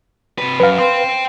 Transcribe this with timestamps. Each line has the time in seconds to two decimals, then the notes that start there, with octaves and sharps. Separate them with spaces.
0.38 C3 B4
0.60 F#2 B4 F5
0.78 G5 C6